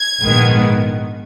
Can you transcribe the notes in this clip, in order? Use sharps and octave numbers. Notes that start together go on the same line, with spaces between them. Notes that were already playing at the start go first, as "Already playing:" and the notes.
Already playing: G#6
A#1 G#2 D#3 G#3 B3